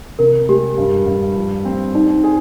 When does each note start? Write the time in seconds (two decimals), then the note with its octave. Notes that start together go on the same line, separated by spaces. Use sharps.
0.19 C3 A#4
0.49 G#3 G4
0.78 G2
1.07 G2
1.36 F3
1.65 C4
1.95 D4 D#4
2.24 G#4